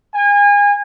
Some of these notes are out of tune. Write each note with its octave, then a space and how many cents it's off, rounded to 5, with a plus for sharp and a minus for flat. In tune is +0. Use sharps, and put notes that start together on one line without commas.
G#5 -30